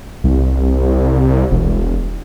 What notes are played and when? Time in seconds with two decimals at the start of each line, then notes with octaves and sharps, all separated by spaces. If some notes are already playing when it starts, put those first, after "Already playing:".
0.24 C2
1.51 E1